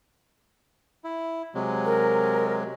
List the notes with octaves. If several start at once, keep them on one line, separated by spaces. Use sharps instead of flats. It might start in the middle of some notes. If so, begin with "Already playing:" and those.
E4
C3 F#3 G#3
A#4